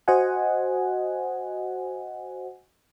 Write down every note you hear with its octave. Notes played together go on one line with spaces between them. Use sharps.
F#4 C5 D#5 F#5 G#5